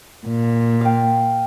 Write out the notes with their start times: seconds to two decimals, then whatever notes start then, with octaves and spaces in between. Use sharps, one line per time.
0.25 A#2
0.81 F5 G5